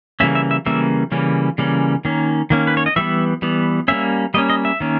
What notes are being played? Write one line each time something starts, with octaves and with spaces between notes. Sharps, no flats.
C#3 E3 G3 A#3 C#4 E5
E5
E5
C#3 E3 G3 A#3 C#4 E5
C#3 E3 G3 A#3 C#4
C#3 E3 G3 A#3 C#4
D#3 A#3 C#4
D#3 A#3 C#4
B4
C#5
D#5
E3 G3 B3 E5
E3 G3 B3
G3 A#3 C#4 E5
G3 A#3 C#4 D#5
D#5
E5
D#3 A#3 C#4